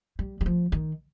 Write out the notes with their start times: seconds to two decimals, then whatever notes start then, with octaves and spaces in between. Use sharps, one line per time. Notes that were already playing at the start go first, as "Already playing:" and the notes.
0.19 G3
0.41 G3
0.46 F3
0.72 D#3